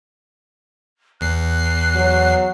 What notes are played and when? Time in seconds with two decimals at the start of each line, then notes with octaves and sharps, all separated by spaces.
1.21 E2 F#6 C7
1.95 F#3